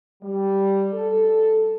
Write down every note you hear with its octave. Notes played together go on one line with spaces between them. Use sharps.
G3
A4